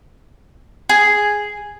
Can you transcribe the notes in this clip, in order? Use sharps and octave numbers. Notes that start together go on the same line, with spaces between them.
G#4